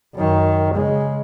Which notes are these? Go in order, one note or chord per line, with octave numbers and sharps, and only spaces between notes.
F#2 D#3
C#3 G#3